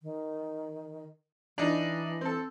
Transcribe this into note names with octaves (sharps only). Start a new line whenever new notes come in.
D#3
E3 D4 D#4
C4 A4